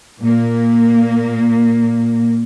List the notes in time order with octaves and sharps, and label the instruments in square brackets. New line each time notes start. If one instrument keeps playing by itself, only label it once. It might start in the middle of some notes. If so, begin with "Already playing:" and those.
[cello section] A#2 A#3